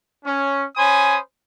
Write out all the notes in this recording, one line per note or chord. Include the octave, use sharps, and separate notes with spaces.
C#4
C#4 C5 G#5 B5 D#6